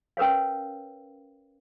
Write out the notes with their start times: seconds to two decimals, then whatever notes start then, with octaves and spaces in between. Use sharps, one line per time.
0.17 C#4 A#4 B4 C#5 F5